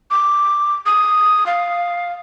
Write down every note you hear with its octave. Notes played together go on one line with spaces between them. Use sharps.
D6
D#6
F5